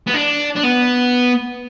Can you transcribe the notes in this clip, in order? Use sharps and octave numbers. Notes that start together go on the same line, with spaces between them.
B3
D4
D4
B3